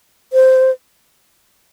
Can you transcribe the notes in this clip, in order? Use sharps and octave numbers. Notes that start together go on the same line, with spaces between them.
C5